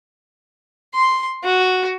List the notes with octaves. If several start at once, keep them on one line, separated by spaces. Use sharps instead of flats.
C6
F#4